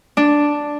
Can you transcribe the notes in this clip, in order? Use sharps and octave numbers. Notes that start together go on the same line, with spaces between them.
D4